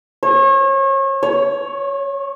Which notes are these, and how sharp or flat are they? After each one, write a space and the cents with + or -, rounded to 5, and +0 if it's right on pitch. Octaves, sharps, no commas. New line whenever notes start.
C#5 -35
C#5 +10